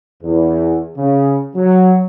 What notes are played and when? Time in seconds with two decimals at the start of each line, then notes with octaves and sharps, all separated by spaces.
0.23 E2
0.96 C#3
1.55 F#3